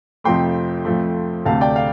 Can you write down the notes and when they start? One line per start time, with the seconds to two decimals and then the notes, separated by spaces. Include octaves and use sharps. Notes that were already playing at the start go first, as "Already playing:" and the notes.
0.24 F2 C3 F3 A3 G5 C6
0.85 F2 F3 A3
1.46 D2 C3 A3 F5 A5
1.61 D5 G5
1.76 F5